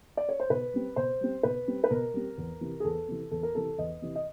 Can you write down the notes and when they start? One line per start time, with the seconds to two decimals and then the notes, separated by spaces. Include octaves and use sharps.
0.17 D5
0.29 C#5
0.40 C5
0.50 B2 B4
0.74 G3 C4
0.96 B2 C5
1.21 G3 C4
1.43 B2 B4
1.67 G3 C4
1.84 B4
1.91 B2 A#4
2.14 G3 C4
2.38 E2
2.61 C3 E3
2.80 G#4
2.84 E2 A4
3.08 C3 E3
3.31 E2 A4
3.43 A#4
3.55 C3 E3 A4
3.78 E2 D#5
4.02 C3 E3
4.15 D#5